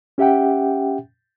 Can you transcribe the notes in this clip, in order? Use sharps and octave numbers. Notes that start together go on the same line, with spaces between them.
C#4 G4 E5 F#5 G5